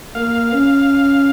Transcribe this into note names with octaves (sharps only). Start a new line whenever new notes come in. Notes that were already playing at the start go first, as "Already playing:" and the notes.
A#3 F5
C#4